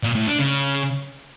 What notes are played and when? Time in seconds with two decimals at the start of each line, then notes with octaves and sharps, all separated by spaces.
0.03 A#2
0.15 A2
0.27 D4
0.39 C#3